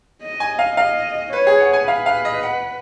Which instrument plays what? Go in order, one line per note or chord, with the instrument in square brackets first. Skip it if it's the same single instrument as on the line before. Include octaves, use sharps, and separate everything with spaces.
[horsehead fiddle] D#5
[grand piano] G#5
F5
[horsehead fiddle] D#5 [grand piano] F5
[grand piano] B4 [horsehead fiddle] C#5
[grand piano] G#4
F#5
G#5
[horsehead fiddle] B4 [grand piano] F5
[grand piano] F5
D#5
F#5